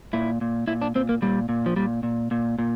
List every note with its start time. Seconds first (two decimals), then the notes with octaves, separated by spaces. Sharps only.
0.13 A#2 E4
0.41 A#2
0.67 A#2 E4
0.82 D4
0.95 A#2 C4
1.09 A#3
1.22 A#2 G3
1.49 A#2
1.66 F3
1.76 A#2 G3
2.03 A#2
2.31 A#2
2.59 A#2